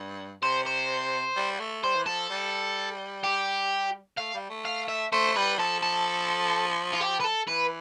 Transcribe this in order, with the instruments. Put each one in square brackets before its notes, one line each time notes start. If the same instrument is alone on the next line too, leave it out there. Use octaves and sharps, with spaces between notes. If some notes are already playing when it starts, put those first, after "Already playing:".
Already playing: [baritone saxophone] G2
[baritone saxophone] C3 [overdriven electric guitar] C5
[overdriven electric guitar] C5
[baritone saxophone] G3
A3
[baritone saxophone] G3 [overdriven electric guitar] C5
[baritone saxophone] E3
[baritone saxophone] F3 [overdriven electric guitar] A4
[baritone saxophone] G3
[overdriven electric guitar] G4
[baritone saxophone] A3 [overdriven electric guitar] F5
[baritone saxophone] G3
A3
[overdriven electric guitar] F5
E5
[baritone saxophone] A3 [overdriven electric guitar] C5
[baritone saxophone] G3 [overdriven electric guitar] B4
[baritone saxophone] F3 [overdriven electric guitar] A4
[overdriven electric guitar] A4
F4
G4
B4
A4
[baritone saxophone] E3 [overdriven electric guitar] B4